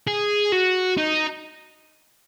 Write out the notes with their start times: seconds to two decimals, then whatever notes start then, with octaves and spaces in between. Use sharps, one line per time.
0.07 G#4
0.52 F#4
0.98 D#4